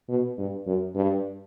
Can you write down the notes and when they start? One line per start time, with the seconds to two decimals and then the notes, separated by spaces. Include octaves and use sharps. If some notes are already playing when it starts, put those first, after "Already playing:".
0.09 B2
0.38 G2
0.66 F#2
0.95 G2